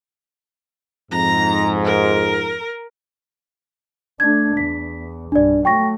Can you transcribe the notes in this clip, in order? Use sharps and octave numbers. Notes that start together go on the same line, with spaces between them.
F2 G#2 A#5
A#4
A3 D4 G#6
E2 B6
B1 G2 D4 D5
F#3 A3 G5 C#6 A#6